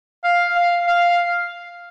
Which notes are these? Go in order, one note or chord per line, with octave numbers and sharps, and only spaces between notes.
F5
F5
F5